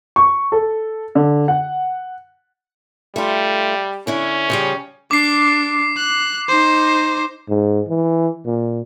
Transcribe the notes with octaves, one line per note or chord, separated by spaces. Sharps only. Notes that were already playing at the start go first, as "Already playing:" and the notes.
C#6
A4
D3
F#5
G3 A3 F4
D3 C#4 E4 C#5
C#3 F3 G3
D4 D6 C7
F#6
D#4 C5
G#2
E3
A#2